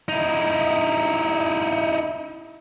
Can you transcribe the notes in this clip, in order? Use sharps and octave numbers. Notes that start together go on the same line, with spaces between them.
D#4 E4